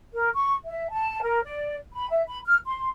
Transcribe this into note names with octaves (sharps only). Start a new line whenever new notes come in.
A#4
C#6
E5
A5
A#4
D5
B5
E5
B5
F6
C6